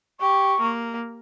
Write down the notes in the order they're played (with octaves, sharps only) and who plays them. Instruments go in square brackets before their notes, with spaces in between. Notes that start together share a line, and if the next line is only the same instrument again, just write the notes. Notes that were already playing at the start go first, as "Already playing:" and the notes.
[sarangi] G4 [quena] C#6
[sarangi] A#3